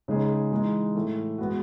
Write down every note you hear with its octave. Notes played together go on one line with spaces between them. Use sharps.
C#3 G#3 D#4 G#4
E3 G#3 D#4
A2 E3 A3
G#3 B3 F#4